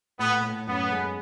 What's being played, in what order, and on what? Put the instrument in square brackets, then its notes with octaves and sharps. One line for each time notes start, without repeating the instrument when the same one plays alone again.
[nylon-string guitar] A2 [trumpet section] B3
[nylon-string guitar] A2
[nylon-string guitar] F#2 [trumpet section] B3
[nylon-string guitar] G#3